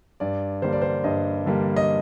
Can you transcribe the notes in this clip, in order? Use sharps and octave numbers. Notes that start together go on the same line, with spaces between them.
G2 D5
D3 G3 A#3 C5
D5
C5
G2 D#5
D3 G3 A#3
D#5